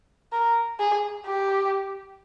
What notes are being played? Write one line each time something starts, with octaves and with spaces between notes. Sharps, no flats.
A#4
G#4
G4